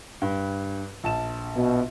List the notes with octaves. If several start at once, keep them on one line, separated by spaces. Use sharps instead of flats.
G2
A#1 A5 E7
B2